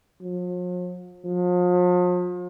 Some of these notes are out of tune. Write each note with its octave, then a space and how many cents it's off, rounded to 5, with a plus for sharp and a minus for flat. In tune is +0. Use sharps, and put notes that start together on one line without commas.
F3 +45
F3 +40